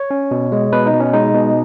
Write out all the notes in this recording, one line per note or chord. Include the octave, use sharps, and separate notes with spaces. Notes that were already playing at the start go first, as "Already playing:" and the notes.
Already playing: C#5
C#4
B2
G#3
B2 B4
D#4
B2
C#4
G#3 D#4
B2